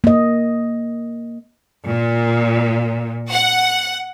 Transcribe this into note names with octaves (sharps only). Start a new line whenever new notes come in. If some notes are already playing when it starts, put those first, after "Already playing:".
A#3 D#5
A#2
F#5